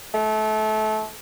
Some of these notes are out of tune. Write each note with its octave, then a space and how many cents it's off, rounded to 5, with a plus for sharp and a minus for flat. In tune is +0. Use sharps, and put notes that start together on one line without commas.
A3 -25